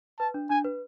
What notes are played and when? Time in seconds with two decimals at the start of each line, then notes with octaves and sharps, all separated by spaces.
0.19 B4 A5
0.34 D4
0.50 D4 G#5
0.64 B4